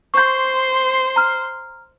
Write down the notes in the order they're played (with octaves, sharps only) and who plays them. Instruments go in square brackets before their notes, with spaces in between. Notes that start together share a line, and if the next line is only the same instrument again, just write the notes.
[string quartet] C5 C6 [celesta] C#6 G6
[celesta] A#5 F6